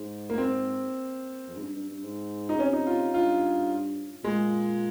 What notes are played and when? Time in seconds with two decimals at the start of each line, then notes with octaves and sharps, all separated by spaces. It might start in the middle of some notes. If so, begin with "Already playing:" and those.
Already playing: G#2
0.30 A#3
0.38 C4
1.48 F2
1.57 G#2
1.62 G2
1.76 G2
1.90 G2
2.04 G#2
2.49 D#4
2.55 C#3
2.59 C3 C#4
2.73 D#4
2.87 F4
3.14 G2 F4
4.24 A#2 G#3